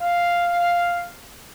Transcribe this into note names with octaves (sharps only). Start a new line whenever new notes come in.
F5